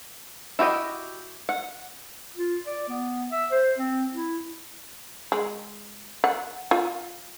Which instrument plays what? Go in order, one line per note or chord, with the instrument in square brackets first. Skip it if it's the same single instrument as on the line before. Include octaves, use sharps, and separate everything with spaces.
[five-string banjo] E4 F#4 G4 D#5
F#5
[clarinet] F4
D5
B3
E5
C5
C4
E4
[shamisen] G#3
F#5
F4